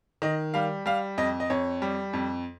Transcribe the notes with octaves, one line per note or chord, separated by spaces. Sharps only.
D#3 D#5
G3 F5
G3 F5
F2 D#5
D#5
F2 C#5
G3
F2